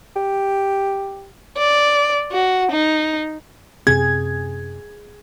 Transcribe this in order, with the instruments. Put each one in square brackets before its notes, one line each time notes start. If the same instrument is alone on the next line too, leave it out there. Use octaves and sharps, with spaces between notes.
[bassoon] G4
[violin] D5
F#4
D#4
[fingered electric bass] F#2 C3 C4 [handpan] G#4 [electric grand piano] G#6